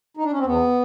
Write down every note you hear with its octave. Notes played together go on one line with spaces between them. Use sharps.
D#4
D4
C#4
C4
E2 B3